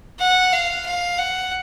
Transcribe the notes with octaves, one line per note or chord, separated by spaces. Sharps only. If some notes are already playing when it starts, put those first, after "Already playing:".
F#5
F5
F5
F#5